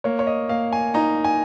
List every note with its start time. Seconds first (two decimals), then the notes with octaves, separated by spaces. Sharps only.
0.04 A#3 C#5
0.19 C#5
0.27 D#5
0.49 A#3 F5
0.73 G#5
0.94 D#4 A#5
1.24 G#5